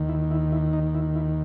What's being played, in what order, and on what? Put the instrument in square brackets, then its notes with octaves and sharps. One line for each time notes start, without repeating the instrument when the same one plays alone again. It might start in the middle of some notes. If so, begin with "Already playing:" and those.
Already playing: [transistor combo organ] D#2 D#3
E4
E4
E4
D#4
E4
E4